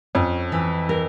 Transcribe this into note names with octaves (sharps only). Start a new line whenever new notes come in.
F2 C#4
E3
A#4